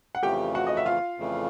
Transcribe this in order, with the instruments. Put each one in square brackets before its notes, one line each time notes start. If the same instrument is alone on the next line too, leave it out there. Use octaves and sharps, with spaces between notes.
[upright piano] F#5
[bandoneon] F2 C#3 E3 A3 [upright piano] G4 G5
[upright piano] F#4 F#5
D#5
E5
F4 F5
[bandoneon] F2 C#3 E3 A3